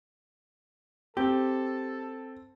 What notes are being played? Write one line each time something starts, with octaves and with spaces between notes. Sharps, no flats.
C4 G4 A4